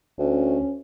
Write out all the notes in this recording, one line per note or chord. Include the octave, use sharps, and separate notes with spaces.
D2 C#4